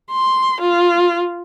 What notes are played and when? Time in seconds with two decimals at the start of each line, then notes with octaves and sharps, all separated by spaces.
0.12 C6
0.61 F4